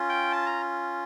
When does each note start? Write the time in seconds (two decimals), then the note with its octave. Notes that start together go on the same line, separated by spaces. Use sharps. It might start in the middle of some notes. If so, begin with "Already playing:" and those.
Already playing: C#4 F4
0.09 G5
0.32 A5
0.46 A#5